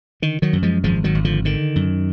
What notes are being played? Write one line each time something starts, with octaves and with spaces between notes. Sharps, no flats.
D3 D#3
D#3 F#3
F#2
F3 G#3
G#1 F3 G#3
D#3 F#3
G#1
D3 F3
D3 D#3
F#2